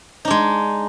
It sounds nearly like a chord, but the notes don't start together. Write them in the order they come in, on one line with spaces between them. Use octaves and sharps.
D#4 D4 G#3